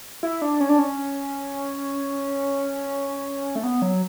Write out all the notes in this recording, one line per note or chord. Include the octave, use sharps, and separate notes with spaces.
E4
D4
C#4
D4
C#4
A3
B3
F#3